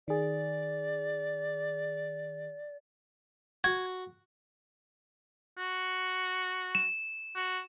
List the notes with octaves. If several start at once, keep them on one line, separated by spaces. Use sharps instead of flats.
D#3 G#4 D5
F#4 G#6
F#4
E7
F#4